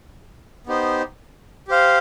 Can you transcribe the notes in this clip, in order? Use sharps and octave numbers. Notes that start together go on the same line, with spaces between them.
B3 D#4 G4 C5
G4 C5 F5